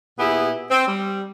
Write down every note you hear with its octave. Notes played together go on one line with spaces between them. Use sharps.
A#2 B3 E4 G4 G#4
C4
G3